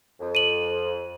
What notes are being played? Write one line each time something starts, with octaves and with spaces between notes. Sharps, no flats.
F2
D#7 F#7